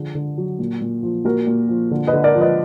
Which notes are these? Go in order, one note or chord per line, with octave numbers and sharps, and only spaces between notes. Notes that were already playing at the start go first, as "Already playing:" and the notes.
Already playing: D3 F3 G#4
D3
F#3
A#2
A#2
F3
A#2 F#4 A#4
A#2
F3
D3
B4 D#5
D3
A#4 D5
F3
B4 D#5